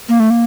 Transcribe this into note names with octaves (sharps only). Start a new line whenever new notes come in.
A#3
A3
A#3